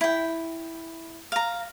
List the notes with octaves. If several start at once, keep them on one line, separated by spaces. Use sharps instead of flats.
E4 G5
F5 A#5